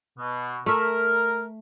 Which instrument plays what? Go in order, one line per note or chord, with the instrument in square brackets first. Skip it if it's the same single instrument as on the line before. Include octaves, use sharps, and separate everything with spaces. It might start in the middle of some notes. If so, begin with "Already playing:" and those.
[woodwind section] B2
[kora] A3 E5 [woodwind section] A#4